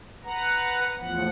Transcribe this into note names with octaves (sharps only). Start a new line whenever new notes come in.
B4 F#5 A#5
E2 A2 F3 F#5